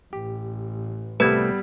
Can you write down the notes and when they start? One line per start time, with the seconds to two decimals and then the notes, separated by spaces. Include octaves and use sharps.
0.13 A1 G4
1.20 C2 G3 A3 B3 G4 B4 A5 G#6